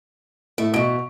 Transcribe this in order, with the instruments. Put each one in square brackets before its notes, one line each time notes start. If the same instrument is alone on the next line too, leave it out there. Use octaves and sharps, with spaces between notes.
[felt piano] A2 [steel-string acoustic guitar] A3
[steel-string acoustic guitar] B2 E3 [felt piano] C#6 D7